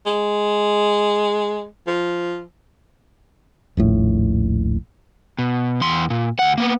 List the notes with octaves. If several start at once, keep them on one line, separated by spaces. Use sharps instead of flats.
G#3
F3
D#1 A#1 A2
B2
E2 C6
A#2
D2 F#5
A#3 B3